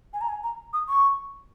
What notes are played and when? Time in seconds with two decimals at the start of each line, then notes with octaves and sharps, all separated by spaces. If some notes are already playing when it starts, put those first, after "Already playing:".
0.13 G#5
0.21 A#5
0.29 G#5
0.44 A#5
0.73 D#6
0.89 C#6